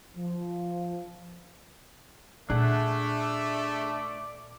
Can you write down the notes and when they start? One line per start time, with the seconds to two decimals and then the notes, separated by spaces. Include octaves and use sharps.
0.16 F3
2.50 A#2 A3 D4 G#4 D5 F#5